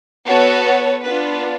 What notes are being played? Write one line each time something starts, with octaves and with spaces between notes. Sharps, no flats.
B3 F#4 A4 C#5
C#5
B3 D4 F4 B4